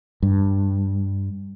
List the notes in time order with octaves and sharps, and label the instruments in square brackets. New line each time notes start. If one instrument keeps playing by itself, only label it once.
[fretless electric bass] G2